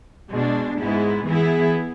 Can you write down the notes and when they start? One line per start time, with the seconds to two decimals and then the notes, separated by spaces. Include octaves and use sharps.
0.32 B2 G#3 D4
0.79 G#2 G#3 B3 E4
1.26 E3 B3 E4 G#4